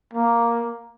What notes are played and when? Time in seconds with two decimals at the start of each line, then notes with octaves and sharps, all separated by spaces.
0.13 A#3